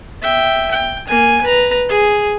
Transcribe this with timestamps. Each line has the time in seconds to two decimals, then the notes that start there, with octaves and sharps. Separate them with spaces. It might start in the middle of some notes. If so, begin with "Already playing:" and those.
0.22 E5 G5
0.71 G5
1.07 A#3 G#5
1.43 B4 A#5
1.89 G#4